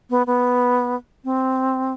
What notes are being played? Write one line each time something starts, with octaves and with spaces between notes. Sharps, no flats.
B3
B3
C4